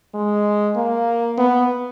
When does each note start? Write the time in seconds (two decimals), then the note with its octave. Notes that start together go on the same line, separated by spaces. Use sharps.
0.15 G#3
0.76 A#3
1.38 B3